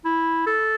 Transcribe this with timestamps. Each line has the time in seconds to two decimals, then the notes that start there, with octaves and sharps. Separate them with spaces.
0.05 E4
0.47 A4